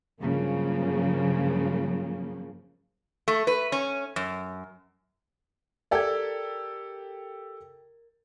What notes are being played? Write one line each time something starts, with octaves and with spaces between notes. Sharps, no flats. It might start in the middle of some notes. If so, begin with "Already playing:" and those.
G2 C#3 F3 F#3 A#3
A3
B4
C#4
F#2
G4 A4 A#4 D5 G#6